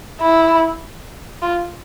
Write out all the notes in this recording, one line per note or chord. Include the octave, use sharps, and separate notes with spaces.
E4
F4